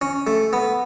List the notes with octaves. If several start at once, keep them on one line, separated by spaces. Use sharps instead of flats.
C#4
A3
B3